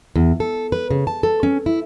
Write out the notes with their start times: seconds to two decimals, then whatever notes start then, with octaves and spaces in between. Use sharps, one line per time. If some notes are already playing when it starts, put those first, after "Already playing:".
0.16 E2
0.40 A4
0.72 B4
0.90 C#3
1.07 A5
1.23 A4
1.43 C#4
1.66 E4